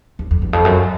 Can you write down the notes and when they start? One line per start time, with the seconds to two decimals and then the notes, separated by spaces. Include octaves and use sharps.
0.19 E2
0.31 F2
0.42 E2
0.53 F2
0.65 F#2